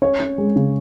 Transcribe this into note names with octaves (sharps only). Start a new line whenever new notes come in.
C#4 C#5
C#4
G#3
C#3